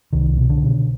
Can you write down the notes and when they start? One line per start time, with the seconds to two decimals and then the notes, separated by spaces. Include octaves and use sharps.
0.13 C2 D#3
0.37 B2
0.49 D3
0.62 B2